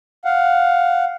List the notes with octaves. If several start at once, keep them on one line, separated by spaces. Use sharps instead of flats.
F5 F#5